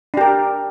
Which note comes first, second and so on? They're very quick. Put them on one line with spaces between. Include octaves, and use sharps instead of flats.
D4 G4 A#4